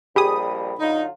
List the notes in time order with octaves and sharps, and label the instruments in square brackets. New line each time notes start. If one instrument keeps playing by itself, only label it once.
[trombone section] A#1 F2 G3 [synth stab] G4 G#4 D#6 [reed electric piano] B5
[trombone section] D3 F#3 F4 [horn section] D#4